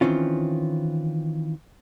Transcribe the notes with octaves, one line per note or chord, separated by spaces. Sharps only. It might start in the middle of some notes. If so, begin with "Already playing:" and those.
D#3 E3 C4 C#4 F4